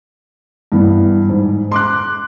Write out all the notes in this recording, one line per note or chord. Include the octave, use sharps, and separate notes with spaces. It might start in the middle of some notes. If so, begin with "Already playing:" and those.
G2 E3 B3
G#2
C6 D6 F#6